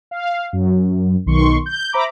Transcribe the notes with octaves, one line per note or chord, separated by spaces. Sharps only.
F5
F#2
B1 D#3 C6 C#6
G6
C5 E5 A#5 B5 D6